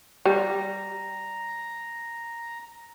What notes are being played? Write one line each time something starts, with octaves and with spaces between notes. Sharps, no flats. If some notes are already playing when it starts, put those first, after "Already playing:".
G3 A#5